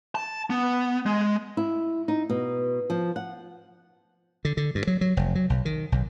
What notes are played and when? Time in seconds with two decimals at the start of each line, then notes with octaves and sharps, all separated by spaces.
0.15 A5
0.50 B3
1.06 G#3
1.57 E4
2.08 D#4
2.30 B2
2.90 F3
3.16 F#5
4.45 D3
4.57 D3
4.75 G2
4.87 F#3
5.01 F#3
5.17 F1
5.35 F#3
5.50 B1
5.65 D#3
5.92 B1